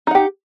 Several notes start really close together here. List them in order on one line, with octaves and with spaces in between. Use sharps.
D#4 F#5 G4